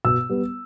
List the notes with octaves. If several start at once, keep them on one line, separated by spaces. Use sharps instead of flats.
B2 E6
G3 B3